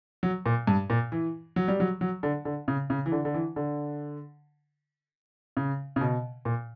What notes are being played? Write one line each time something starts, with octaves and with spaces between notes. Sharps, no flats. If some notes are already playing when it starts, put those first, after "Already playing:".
F#3
A#2
G2
A#2
E3
F#3
G3
F#3
F#3
D3
D3
C#3
C#3
E3
D3
D3
E3
D3
C#3
C#3
B2
A#2